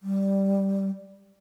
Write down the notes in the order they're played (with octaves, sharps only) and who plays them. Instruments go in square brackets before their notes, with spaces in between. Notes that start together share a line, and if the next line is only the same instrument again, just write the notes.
[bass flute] G3